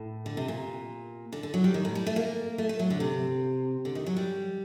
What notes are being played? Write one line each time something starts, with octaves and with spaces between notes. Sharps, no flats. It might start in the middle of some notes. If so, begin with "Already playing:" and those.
Already playing: A2
D3
C3
A#2
D3
D3
F#3
G3
D#3
A2
G3
A3
A#3
A3
A3
F#3
D3
C3
D3
D#3
F#3
G3